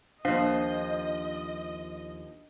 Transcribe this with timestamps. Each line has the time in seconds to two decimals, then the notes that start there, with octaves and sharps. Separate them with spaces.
0.25 D#2 F3 D4 D#5 F5